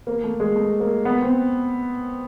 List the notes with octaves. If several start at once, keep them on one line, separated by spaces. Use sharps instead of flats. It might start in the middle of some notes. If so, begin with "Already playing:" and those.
A#3
A3
G#3
A3
A#3
B3
C4